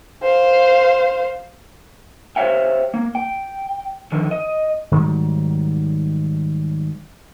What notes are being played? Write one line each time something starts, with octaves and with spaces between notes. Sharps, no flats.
C5 F5
G4 C5 C#5 E5 F5 G5
A#3
G5
D3 D#3 F3
D#5
G#2 D#3 F#3 G3